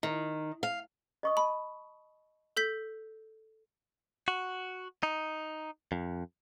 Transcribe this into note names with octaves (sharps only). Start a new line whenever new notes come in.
D#3
F5
D#5 C#6 D#6
A5 B5
A4 G6 B6
F#4
D#4
F2